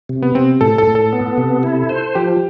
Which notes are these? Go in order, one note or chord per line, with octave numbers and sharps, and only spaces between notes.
C3
B3
C3 C4
A2 A4
A4
A2
A4
B3
C3
E4
C5
F3 G4